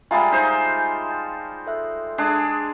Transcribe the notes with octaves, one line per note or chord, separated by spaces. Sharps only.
G3 G#3 F4 E5 G#5 A#5
D#4 C5
A5
A4 E5 F#6
G#3 D4 G#4